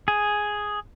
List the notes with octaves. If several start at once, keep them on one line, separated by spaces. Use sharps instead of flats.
G#4